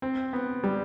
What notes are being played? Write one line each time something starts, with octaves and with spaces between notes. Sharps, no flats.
C4
B3
G3